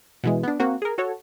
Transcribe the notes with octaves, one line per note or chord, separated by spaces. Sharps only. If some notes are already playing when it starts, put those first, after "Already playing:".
B2 E3 G#3
B3 D4
A#3 C4 F#4
G#4 A#4
F#4 A4 C#5